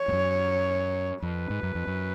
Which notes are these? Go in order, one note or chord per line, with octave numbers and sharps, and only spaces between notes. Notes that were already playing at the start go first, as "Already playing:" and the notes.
Already playing: C#5
G#2
F#2
F2 B4
G#2
F#2
F2
F#2